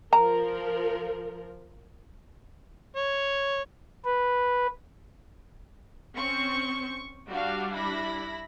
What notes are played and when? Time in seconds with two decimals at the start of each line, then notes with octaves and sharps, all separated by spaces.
0.13 F3 A#4 A#5
2.96 C#5
4.05 B4
6.15 C4 C#4 C5 C#6
7.28 G3 D4 F#4 F5
7.71 E4 B5 A#6